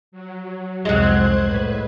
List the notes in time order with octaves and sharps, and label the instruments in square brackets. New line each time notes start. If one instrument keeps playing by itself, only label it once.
[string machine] F#3
[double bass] C2 F2 [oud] F#3 G#3 [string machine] C5 F#6 G#6
[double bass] A2 [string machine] B4